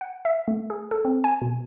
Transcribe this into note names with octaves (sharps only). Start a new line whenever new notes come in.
F#5
E5
A3
G#4
A4
C4
G#5
B2